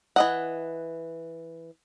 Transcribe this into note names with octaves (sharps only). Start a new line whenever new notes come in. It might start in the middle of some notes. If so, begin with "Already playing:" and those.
E3 D#5 F#5